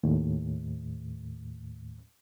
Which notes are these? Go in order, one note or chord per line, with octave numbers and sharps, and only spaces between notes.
D#2 A2